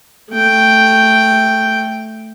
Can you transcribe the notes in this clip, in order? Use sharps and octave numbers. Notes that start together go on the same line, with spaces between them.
A3 G5